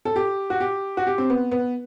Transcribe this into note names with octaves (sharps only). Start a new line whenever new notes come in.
A4
G4
F#4
G4
F#4
G4
C4
B3
B3